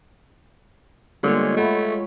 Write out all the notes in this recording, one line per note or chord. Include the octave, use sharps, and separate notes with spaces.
D3 G3 G#3 A#3 B3 F4 C#5
A3 E5 F#5 B5